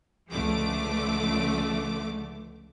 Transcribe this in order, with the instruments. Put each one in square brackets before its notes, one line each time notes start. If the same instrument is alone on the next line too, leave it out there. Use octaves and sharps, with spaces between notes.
[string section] C#2 D3 F3 A3 D6